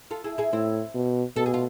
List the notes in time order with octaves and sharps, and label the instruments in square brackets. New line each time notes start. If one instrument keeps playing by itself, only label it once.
[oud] F4 A4
E4 G#4
E4 G#4
[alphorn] A2 [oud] C4 E4
[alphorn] B2
[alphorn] B2 [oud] A4
[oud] G#4
F4